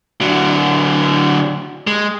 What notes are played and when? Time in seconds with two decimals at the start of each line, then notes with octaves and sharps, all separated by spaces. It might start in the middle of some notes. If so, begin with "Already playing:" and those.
0.21 D3 F#3
1.87 G#3